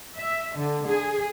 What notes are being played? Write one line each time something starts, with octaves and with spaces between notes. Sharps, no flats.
E5
D3
G#4